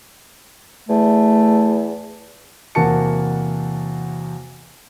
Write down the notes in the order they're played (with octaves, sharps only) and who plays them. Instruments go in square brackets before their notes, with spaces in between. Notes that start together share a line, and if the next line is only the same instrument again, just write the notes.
[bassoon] E2 [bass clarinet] A3
[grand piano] E2 C3 A#3 F#4 A5 C#7